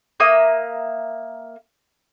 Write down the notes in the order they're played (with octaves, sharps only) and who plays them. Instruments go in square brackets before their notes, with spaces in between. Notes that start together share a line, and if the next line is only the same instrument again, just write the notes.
[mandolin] A#3 E5 A#5 D#6